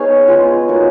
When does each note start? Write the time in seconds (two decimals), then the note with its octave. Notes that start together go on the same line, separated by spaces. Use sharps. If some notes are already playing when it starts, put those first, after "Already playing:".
Already playing: B3 D#4 G#4 B4 C#5 F5
0.28 G#3 C#4 F4
0.69 A#3 D#4 F#4